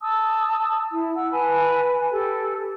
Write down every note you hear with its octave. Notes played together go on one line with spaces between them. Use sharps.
A5 D#6 E6
E4
F#5 E6
B4 G#5 A5 B5
G4 A4